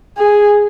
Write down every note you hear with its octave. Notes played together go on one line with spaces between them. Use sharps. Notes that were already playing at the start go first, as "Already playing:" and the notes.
G#4